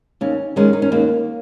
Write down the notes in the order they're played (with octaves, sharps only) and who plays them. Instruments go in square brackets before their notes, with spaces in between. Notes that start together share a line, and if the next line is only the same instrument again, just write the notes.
[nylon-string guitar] D#2 C#4
D#3 G#3 C#4
D#4
C#4
D#2 A#3